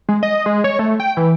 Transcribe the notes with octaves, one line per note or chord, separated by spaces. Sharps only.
G#3
D#5
G#3
C#5
A3
G5
E3